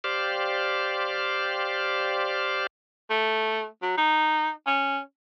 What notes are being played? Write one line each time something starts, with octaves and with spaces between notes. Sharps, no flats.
G4 C5 D5 F5
A3
F#3
D#4
C#4